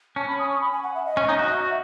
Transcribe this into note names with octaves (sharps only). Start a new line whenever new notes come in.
C#4 A5
B5
D#6
C#6
B5
G#5
F#5
E5
D#5
C#4
D#4
F#4
E5